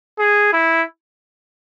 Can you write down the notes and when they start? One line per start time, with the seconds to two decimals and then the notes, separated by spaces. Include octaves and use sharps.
0.19 G#4
0.53 E4